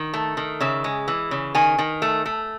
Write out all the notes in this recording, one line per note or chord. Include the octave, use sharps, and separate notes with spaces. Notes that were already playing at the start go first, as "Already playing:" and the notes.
Already playing: D#3
A3
D#3
C#3 E5
G#3
E3
C#3
D#3 G#5
D#3
A3
A3